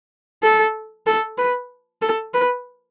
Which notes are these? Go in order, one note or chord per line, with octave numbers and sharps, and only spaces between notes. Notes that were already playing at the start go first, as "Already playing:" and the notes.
A4
A4
B4
A4
B4